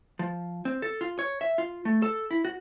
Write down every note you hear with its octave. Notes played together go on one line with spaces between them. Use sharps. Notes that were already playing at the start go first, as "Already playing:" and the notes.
F3
C4
A4
F4
C#5
E5
F4
A3
A4
E4
F#4